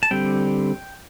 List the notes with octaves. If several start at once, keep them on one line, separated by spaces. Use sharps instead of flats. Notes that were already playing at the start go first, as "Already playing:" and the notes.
A5
D3 G3 C4 G5